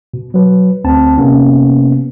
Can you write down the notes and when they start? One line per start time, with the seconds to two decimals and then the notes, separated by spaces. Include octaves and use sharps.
0.14 B2
0.34 F#3 B4
0.84 D2 C4 A5
1.18 C3 A#3 B3 C#4